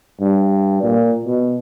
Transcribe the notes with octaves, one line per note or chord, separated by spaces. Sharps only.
G2
A#2
B2